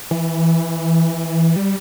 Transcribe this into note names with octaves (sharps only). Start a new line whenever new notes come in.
E3
G3